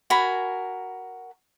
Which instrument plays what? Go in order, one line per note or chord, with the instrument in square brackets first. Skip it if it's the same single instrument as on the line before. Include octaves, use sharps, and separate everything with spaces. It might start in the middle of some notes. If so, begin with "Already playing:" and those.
[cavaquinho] F#4 A#4 G#5 B5